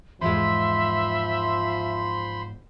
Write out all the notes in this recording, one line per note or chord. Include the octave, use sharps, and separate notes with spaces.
E2 G#2 F3 G#3 C5 E5 B5 C6